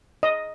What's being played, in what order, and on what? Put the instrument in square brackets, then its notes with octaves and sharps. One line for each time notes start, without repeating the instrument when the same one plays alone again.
[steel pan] D#5